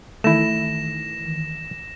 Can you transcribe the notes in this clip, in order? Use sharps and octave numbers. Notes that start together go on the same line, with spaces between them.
D#3 E3 A3 E4 A#6 E7